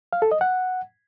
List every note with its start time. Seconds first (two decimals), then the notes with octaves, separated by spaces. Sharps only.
0.13 F5
0.22 A4
0.32 D#5
0.41 F#5